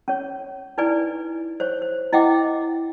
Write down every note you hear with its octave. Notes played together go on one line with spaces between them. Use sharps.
C#4 C#5
D#4 E4 B4 D5 G#5
C5 C#5
C5
E4 D#5 E5 F#5 G5 D6